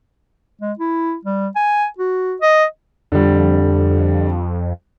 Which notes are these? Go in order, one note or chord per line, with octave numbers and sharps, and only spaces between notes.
G#3
E4
G3
G#5
F#4
D#5
F2 D3 G3